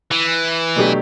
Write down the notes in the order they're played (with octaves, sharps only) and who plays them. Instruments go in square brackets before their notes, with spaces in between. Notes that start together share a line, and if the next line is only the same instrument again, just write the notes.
[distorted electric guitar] E3
[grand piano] B2 F#3 A3 D4 G4